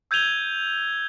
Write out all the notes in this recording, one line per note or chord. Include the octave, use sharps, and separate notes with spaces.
E6 G6 G#6 D#7 F7 G7